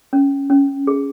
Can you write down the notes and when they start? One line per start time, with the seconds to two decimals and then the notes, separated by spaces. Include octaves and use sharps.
0.13 C#4
0.50 C#4
0.87 G#4